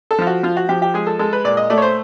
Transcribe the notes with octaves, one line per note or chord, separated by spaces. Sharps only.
A4
F3 F4
F#4
F3 F4
F#4
F3 G4
G4
G#3 G#4
A4
G#3 A4
B4
A#2 D5
D#5
A3 D5
C#5
C5